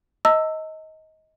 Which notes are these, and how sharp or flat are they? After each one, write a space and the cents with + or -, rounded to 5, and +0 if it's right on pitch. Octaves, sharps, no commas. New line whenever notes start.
D#5 +20 A5 +45 E6 +0